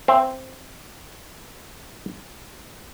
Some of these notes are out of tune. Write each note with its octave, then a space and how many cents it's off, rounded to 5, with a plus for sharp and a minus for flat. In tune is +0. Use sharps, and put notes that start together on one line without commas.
C4 +0 E5 +45